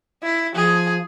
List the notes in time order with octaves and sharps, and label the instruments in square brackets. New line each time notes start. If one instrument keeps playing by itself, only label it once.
[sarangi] E4
[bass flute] F3 [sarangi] G#4